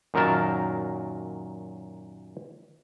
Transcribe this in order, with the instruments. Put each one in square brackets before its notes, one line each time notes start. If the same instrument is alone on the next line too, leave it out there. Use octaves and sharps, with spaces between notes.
[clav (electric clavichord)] F#2 A#2 D#3 F#3 A#4 A5